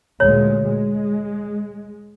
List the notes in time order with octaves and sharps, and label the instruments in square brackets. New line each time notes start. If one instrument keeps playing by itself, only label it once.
[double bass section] D2 A#2 G#3 [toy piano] C#5
[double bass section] G#3